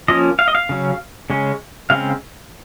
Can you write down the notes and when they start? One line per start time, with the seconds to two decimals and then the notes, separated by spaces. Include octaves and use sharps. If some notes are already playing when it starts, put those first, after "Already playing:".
0.08 F3 A#3 C#4 D#5
0.39 F5
0.48 D#5
0.55 F5
0.69 C#3 F#3 C#4
1.30 C#3 G#3 C#4
1.90 C#3 G#3 C4 F5